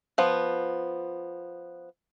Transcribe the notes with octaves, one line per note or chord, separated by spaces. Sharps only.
F3 B3